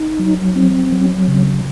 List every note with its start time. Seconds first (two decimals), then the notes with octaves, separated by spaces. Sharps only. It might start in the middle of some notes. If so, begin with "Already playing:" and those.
Already playing: D#4
0.19 F#3
0.55 C4
0.92 F#3
1.28 C#3